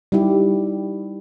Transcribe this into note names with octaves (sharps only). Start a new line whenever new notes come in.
G3 D#4 E4 G4